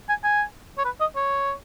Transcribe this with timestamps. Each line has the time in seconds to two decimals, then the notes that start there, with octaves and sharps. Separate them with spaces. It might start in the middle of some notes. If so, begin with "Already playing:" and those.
0.09 G#5
0.24 G#5
0.78 C#5
0.85 B4
1.01 D#5
1.16 C#5